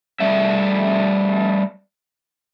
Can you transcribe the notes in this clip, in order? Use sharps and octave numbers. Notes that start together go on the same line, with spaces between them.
G3 A3 E5